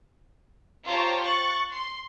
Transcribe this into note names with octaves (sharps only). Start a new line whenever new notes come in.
F4 G4 C5 C#5 A5 A#5
C#6 F#6 A6
C6